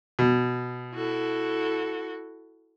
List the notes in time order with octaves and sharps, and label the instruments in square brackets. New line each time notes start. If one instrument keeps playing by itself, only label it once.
[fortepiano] B2
[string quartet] E4 F#4 A4